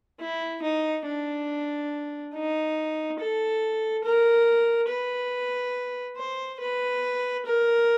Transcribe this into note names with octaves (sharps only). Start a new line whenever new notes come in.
E4
D#4
D4
D#4
A4
A#4
B4
C5
B4
A#4